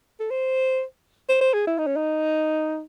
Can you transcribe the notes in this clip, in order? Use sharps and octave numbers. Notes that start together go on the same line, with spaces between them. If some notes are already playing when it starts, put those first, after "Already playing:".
A4
C5
C5
C5
G#4
E4
D#4
C#4
D#4